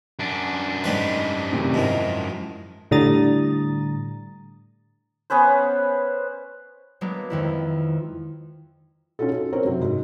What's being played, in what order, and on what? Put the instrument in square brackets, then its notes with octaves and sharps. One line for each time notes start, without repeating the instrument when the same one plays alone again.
[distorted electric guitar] F#2 D4
[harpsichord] G#2 G3 B4
[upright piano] A2 C3 D#3
[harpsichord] G#2 D#3 [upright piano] F3 E4
[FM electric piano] A2 D3 G3 A#5 D#6 A6
[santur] B3 C#4 B4 C5
[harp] F#3 G#3 A#3 B3 D4
F2 D#3 E4
[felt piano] C#4 D#4 F4 F#4 A4
A4
C4 A#4 C5 C#5
F#2 C3 F#3 C4
G#2